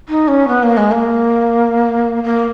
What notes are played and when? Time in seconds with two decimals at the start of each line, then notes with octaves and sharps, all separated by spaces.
0.09 D#4
0.28 C#4
0.48 B3
0.63 A#3
0.77 G#3
0.91 A#3
2.24 A#3